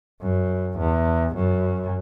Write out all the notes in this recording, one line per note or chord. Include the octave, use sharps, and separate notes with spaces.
F#2
E2
F#2